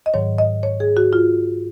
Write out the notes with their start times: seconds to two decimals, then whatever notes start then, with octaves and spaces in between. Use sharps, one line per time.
0.06 D#5
0.14 G#2 D#3 F#3 C#5
0.38 D#5
0.63 C#5
0.80 G#4
0.97 F#4
1.13 F4